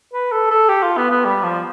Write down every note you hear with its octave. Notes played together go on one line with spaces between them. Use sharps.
B4
A4
A4
G4
F4
B3
B3
G3
F3